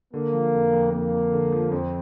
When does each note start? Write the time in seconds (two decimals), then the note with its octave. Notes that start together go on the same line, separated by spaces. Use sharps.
0.14 D3 A#3
0.33 F3
0.53 F2
0.73 F2
0.92 F2 A#3
1.13 D3
1.32 D3
1.52 F3
1.71 F2 C4